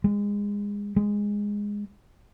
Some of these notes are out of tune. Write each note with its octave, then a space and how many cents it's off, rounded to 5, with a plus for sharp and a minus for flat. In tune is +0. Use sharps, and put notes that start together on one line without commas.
G#3 -25
G#3 -10